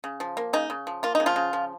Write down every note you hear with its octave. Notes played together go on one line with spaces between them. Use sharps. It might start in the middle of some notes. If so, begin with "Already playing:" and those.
C#3
F3
A#3
C#3 D#4
C#3
F3
A#3 F4
D#4
C#3
F3 F4
C#3
F3